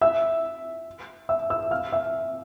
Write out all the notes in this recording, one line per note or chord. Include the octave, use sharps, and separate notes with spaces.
E5 E6
E5 E6
E5 E6
F5 F6
E5 E6